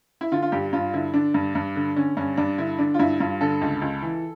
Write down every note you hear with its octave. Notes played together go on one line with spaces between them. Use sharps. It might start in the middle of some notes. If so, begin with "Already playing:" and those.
E4
D3 F4
F4
G2 G4
G2 F4
D3 E4
D3 D4
G2
G2
D3
D3 C#4
G2 C#4
G2 D4
D3 E4
D3 D4
F4
G2 E4
G2 F4
D3 A4
C#2
C#2
E3